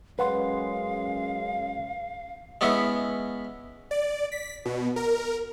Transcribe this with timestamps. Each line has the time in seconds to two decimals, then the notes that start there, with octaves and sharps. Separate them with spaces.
0.19 F#2 G#3 C#4 B4 F5 F#5 C6
2.61 G#3 B3 C#4 E4
3.91 D5
4.32 B6
4.65 B2
4.96 A#4